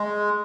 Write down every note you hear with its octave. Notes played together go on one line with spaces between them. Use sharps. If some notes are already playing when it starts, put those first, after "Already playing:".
Already playing: G#3